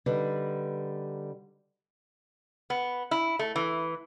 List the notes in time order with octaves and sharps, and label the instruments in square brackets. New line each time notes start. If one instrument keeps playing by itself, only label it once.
[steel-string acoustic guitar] D3 G3 D#4 B4
[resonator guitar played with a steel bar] B3
E4
A3
E3